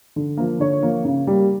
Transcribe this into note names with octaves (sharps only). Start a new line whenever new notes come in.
D3
F3 A#3
D3 C#5
F3 A#3
C#3
G3 A#3